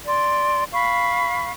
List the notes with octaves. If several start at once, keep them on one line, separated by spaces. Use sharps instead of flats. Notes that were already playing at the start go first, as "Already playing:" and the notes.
D5 C6
F5 B5 C#6